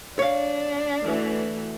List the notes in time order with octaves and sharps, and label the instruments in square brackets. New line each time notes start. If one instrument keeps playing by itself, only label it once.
[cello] D4 [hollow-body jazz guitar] C#5 F5
[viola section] E3 A3 F#4